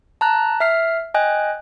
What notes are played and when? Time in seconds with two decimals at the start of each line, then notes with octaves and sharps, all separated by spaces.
0.21 A5 A#5 F#6
0.60 E5 F6 C7
1.14 D#5 G5 G#5 F#6